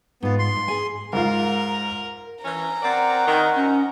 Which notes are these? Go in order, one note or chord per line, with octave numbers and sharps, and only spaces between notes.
G#2 B3 F4
C6
G#2
G#4 G#5
G#2 F4 A#4
E3 C#4 A#5
C4 A#4 D5 F#5
D#3
F#3 C4 C#4 D#4